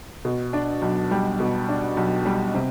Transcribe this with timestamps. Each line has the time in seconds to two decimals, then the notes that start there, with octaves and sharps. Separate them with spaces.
0.25 B2
0.53 D4
0.82 B1
1.11 G3
1.40 B2
1.69 D4
1.97 B1
2.25 G3
2.55 C3